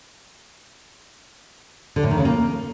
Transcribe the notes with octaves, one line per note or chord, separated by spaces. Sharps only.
D3
A2
D#3
C#3
A#3